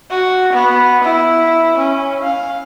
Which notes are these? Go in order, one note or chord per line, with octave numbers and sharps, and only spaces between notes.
F#4
B3
E4
C#4
F5